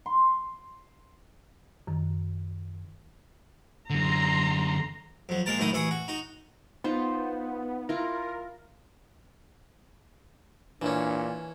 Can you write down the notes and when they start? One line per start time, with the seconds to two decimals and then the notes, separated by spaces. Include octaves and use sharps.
0.06 C6
1.87 F#2 D#3
3.90 F#2 D3 A#5 C6
5.29 F2 F#3
5.46 G#3 A#3 A#4 A5
5.58 F#2 A2 D#3 D#4 E4 D#6
5.73 A1 E4 G#4 C#6 D#6
5.91 F#4
6.08 D#4 F#4
6.84 B3 D#4 F4 C5
7.89 E4 F4 A#4
10.82 A#2 E3 C#4 D4